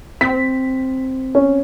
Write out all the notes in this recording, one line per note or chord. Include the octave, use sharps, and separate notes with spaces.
C4 B6
C#4